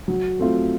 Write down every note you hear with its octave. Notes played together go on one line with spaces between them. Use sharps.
F#3
A3 C4 F4